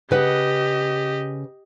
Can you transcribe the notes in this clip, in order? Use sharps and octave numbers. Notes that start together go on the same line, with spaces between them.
C#3 G4 B4 D#5 F#5